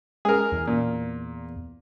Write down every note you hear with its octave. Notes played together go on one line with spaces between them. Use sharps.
G#3 G#4 A#4
E2
A#2